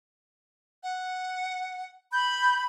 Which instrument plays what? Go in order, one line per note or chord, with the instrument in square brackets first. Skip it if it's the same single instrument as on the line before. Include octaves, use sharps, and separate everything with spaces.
[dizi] F#5
[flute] B5 [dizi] G6